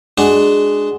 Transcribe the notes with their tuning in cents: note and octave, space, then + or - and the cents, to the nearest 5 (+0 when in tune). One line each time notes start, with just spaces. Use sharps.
G#3 +0 D4 +10 F#4 +20